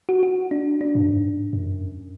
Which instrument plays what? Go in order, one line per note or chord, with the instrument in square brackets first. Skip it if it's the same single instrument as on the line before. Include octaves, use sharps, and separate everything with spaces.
[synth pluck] F#4
F#4
D4
D4
[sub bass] G#2
F#2
G#2
F#2